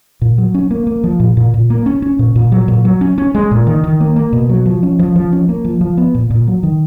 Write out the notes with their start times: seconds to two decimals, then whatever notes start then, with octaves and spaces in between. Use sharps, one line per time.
0.22 A#2
0.38 F#3
0.54 C#4
0.71 A#3
0.87 A#3
1.04 F3
1.20 A#2
1.37 A#2
1.54 A#2
1.70 A#3
1.86 C#4
2.02 C#4
2.19 A#2
2.36 A#2
2.52 F#3
2.68 A#2
2.85 F#3
3.01 C#4
3.18 C#4
3.35 G#3
3.51 A#2
3.67 D#3
3.84 D#3
4.00 A#3
4.16 A#3
4.33 B2
4.50 F#3
4.66 F3
4.83 C#4
4.99 F3
5.16 F3
5.33 C#4
5.49 A#3
5.65 F3
5.81 F3
5.97 B3
6.15 A#2
6.31 A#2
6.47 F#3
6.63 D#3